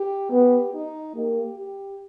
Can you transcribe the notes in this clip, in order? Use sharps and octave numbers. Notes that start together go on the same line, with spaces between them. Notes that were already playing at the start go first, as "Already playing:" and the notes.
Already playing: G4
B3 G4
D#4
A#3 G4
G4